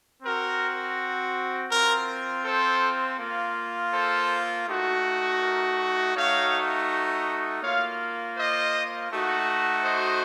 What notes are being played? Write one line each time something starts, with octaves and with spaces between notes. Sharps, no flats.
C4 F#4 A#4
C4 F4 A#4
A4 C5
A#3 F4
A4 C5
A3 D#4 F#4
A#4
A3 D#4 F#4 C#5 F5
A#3 F4 C#5 F5
C5 D#5
A3 D#4 F#4
C5 D#5